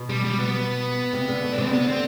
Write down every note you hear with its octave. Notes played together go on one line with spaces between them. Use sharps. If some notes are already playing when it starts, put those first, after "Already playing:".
Already playing: B2
G3
G3
B3
C3
D3
B2
D4
C3 C4
D3 B3
C4